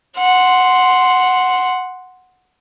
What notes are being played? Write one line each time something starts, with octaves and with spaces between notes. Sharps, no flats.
F#5 C6